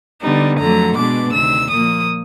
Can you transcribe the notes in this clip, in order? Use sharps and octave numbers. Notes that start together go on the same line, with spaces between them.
D3 G3 B3 D#4
F2 D3 F#3 A3 A#5
B2 G#3 B3 D4 D6
D2 C3 D#3 E6
A#2 F3 A#3 D#6